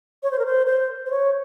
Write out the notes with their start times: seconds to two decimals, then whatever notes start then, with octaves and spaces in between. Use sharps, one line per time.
0.23 C#5
0.31 C5
0.39 A#4
0.46 C5
0.66 C5
1.06 C5
1.10 C#5